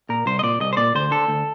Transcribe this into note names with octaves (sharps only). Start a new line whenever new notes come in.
A#2 A#4
C2 C5
D#5
A#2 D5
C2 D#5
C5
A#2 D5
D2 C5
D3 A4
D2